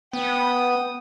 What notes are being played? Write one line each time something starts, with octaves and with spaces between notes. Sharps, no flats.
B3 G5 D#6